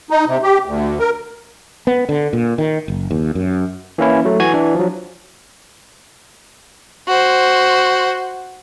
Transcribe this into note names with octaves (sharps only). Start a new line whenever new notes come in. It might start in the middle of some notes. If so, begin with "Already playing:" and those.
D#4
C3
G4
D2
A#4
B3
D3
A#2
D#3
F#1
D#2
F#2
E3 A#3 C#4 E4
F#3 A3
E3 F#4 G#5 G#6
E3 D4
F3 F#3
F#4 C5